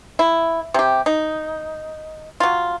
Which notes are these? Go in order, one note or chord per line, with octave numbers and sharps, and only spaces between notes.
E4
C3 G4
D#4
F#3 F4